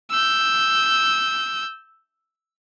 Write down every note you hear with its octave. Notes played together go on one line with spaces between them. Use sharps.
E6 G6